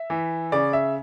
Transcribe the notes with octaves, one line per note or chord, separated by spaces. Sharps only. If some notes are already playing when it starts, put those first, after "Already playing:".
Already playing: E5
E3
C#3 D5
E5